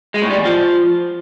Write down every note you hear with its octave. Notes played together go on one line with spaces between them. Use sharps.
G#3
A2
G3
E2
F3